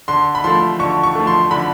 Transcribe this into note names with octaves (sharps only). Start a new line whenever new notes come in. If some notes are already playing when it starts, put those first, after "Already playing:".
D3 C6
B5
F3 A3 C6
D3 C#6
C#6
F3 A3
C6
D3 B5